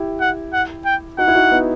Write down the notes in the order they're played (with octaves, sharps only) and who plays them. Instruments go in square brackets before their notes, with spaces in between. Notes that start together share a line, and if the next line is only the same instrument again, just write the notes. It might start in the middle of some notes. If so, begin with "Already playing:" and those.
Already playing: [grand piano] E4 G4
[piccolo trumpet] F#5
F#5
G5
[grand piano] D#4 F#4 [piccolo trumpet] F#5
[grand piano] E4
D#4 F#4
B3 D#4